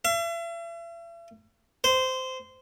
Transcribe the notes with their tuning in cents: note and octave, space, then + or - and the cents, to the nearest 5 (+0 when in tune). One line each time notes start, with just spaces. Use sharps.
E5 +40
C5 -15